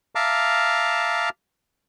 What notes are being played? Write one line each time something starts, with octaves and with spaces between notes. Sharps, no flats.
E5 F5 A5 A#5 D6 F6